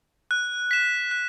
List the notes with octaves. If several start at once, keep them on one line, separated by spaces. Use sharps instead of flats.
F#6
B6 E7
F#6